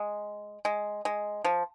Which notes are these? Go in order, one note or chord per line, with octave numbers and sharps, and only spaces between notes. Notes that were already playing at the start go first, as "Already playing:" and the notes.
Already playing: G#3
G#3
G#3
F3